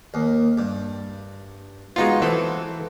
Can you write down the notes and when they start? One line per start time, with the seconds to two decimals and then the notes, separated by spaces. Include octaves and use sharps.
0.14 D#2
0.58 G2
1.96 G#3 B3 D#4 F4 F#4
2.22 E3 C4 A4